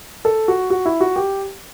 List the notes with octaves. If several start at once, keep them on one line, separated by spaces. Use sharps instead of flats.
A4
F#4
F#4
E4
F#4
G4